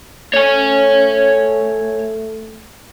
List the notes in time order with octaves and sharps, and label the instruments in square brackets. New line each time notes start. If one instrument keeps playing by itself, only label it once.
[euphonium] A3 [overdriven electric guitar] C#5 G#5